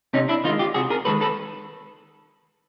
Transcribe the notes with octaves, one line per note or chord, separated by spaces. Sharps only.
C3 C#4 D#4
D4 E4
D#3 G#3 D#4 F4
F4 G4
C3 F#4 G#4
G#4 A#4
D#3 G#3 A4 B4
A4 B4